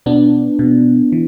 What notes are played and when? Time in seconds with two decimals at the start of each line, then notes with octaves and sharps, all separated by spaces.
0.06 B2 B3 D4
0.59 B2
1.12 E3